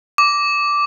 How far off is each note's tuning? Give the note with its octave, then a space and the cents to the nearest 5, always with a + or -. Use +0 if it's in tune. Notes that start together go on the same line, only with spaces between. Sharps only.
D6 -10